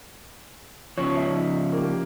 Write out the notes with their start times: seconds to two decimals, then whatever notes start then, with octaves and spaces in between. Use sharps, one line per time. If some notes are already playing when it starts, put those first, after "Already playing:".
0.98 C#3 F3 C#5
1.17 D#4 E5
1.73 A#3 G4